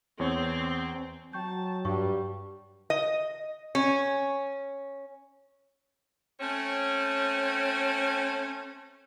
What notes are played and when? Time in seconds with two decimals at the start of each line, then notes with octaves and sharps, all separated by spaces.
0.20 E2 C4 C#5
1.33 F#3 G5 A5 C#6 G6
1.85 G2 G3 C#6
2.90 D#5
3.75 C#4
6.40 A3 C4 C#4